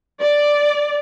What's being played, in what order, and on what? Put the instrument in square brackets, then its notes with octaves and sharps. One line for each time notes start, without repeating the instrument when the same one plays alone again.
[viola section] D5